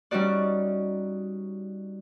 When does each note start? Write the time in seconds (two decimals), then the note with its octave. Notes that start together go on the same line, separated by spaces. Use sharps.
0.11 G3 C#4 D#4 F#4 D5